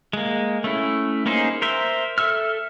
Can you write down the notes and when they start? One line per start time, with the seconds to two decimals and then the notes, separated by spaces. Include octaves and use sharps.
0.13 G#3 A#3
0.64 A3 C#4 E4
1.26 A#3 C#4 D#4 G#4 C5
1.62 A#4 C5 E5
2.18 A4 E5 E6 F6